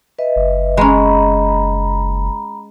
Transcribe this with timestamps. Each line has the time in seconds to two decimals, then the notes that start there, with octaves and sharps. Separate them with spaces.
0.19 B4 D#5 E5
0.36 F#1
0.77 G#3 C#4 A#5 B5